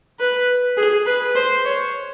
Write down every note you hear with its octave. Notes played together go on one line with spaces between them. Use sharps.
B4
G#4
B4
C5
C#5